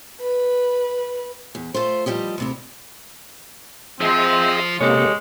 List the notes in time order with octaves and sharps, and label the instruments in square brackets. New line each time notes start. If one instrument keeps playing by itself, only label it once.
[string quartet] B4
[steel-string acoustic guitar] E2
A3 F4 C5
E3 F3 G3 G4 D#5
D2 C3 E4
[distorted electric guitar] F3 F4 [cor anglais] C4 [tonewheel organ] G#4 D#5 E5
[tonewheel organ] C3 A#3 [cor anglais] G#3 [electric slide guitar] G4 A4 C#5